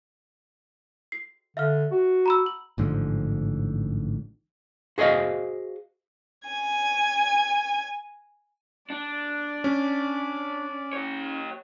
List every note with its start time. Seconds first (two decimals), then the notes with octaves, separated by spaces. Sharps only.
1.12 C7
1.57 D3 E5 F5 F6
1.92 F#4
2.26 A#5 B5 E6
2.46 F#7
2.78 A1 G#2 D3 F3
4.98 F#4 G#4 C5 D#5 F5
6.48 G#5 G#6
8.90 D4 D5
9.64 C#4
10.93 G4 C#5